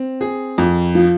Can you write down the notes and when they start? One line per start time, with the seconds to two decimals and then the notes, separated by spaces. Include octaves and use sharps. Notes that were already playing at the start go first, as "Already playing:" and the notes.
Already playing: C4
0.21 G#4
0.58 F2
0.95 F3